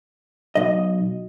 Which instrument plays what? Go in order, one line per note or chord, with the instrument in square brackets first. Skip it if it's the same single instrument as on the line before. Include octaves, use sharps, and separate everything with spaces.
[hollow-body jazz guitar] B1 D#5